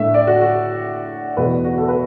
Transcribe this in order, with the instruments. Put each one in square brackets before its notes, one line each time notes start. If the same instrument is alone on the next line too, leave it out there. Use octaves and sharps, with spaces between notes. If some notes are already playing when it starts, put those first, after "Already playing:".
Already playing: [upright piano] A2 A3 D4 E5
D5
F#4
F#4
E2 B2 A3 B4
F#4
A4
B4